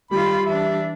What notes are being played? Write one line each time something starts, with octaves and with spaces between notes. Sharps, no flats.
D#3 G3 F4 B5
E3 D4 E5